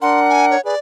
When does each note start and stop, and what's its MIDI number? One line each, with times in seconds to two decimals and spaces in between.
0.02 0.56 62
0.02 0.56 70
0.02 0.59 78
0.02 0.20 84
0.29 0.46 80
0.51 0.61 73
0.65 0.75 68
0.65 0.75 71
0.65 0.79 74